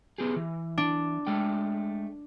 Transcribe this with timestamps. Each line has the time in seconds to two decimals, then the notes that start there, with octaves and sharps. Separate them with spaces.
0.18 B3 G4 G#4
0.36 E3
0.78 D4
1.27 G#3 A3 G5